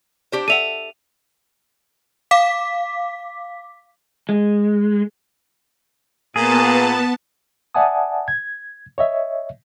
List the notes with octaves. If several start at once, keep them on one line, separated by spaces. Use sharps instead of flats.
D4 G4 C5
A4 E5 F#5 D#7 F7
F5 D6 B6
G#3
A#2 B3 G#4 A5
D5 E5 F#5 G#5 A5 D#6
G#6
C#5 D#5 E5